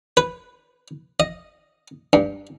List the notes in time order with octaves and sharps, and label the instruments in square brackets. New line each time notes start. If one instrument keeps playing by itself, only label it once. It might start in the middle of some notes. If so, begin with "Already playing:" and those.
[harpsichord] B4
D#5
G2